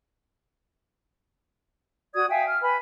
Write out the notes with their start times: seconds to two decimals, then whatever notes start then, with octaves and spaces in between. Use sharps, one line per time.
2.15 F#4 D5 D#6 G#6
2.30 E5 F5 G5 G#5
2.47 F6
2.62 B4 G#5 B5